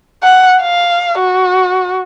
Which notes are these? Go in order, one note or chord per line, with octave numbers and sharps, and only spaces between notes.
F#5
F5
F#4